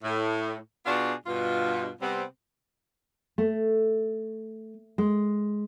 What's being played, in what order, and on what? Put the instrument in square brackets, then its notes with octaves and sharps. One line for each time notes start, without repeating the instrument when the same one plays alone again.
[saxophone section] A2
B2 B3 D4 F4 F#4 G#4
G2 B2 F4
C3 G3 B3 C4
[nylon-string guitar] A3
G#3